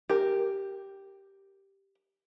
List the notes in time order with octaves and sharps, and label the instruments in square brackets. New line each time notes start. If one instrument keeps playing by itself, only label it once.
[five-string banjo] G4 A#4